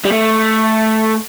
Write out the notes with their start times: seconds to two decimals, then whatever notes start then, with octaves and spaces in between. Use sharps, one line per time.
0.05 G3
0.12 A3